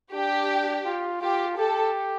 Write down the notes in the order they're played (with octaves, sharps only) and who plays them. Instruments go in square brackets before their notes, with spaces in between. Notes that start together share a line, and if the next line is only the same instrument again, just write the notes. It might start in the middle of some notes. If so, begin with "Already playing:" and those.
[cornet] D4 [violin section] G4
[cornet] F4
[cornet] F4 [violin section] G4
[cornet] G4 [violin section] A4